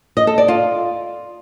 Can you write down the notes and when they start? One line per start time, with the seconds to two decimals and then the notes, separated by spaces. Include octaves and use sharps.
0.17 D#5
0.27 A4
0.38 D5
0.48 F4